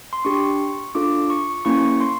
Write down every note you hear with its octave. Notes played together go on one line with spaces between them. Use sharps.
C6
D4 G4 C#6
D4 F4 A4 D6
C#6
A#3 C#4 E4 C#6
C6